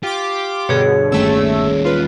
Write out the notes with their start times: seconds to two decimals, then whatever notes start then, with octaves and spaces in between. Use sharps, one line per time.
0.03 F4 G4 D6
0.69 G2 B2 D3 G#4 C#5
1.12 G1 D#2 A3 C#4 E6
1.85 F4 B4